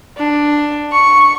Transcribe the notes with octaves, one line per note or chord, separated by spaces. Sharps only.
D4
C#6